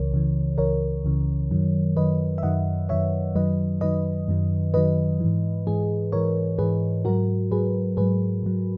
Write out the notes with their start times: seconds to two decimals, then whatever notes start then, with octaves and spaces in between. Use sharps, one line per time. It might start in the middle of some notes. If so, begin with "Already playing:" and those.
Already playing: C#2 C#3 E3 A#4 C#5
0.12 C#2 C#3 E3
0.58 C#2 C#3 E3 A#4 C#5
1.05 C#2 C#3 E3
1.51 F#2 D#3 F#3
1.97 F#2 D#3 F#3 B4 D#5
2.38 E5
2.43 F#2 D#3 F#3 D#5 F#5
2.89 F#2 D#3 F#3 C#5 E5
3.35 F#2 D#3 F#3 B4 D#5
3.81 F#2 D#3 F#3 B4 D#5
4.28 F#2 D#3 F#3
4.74 F#2 D#3 F#3 B4 D#5
5.20 G#2 E3
5.67 G#2 E3 G#4
6.12 G#2 E3 A#4 C#5
6.58 G#2 E3 G#4 B4
7.05 G#2 F#3 F#4 A#4
7.51 G#2 F#3 G#4 B4
7.97 G#2 F#3 G#4 B4
8.43 G#2 F#3